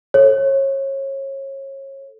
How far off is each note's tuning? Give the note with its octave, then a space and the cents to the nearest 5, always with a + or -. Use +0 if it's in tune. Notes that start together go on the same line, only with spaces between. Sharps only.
A4 +0 C#5 -30